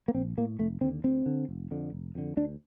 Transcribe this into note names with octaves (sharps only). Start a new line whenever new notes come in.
A#3
A#1 C4
A2 A#3
F1 A3
D#2 D3 C4
D2 C4
D3
F1
F2 D3
F1
F2 D3
D2 D4